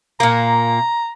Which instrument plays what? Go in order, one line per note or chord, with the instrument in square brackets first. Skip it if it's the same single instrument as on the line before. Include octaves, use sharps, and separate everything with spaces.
[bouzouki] A#2 A#3 [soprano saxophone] A#5